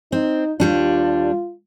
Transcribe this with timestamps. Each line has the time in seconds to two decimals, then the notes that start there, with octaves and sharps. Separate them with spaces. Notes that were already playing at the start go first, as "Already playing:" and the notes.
0.12 C4 D#4
0.60 D#2 G3 D4 F4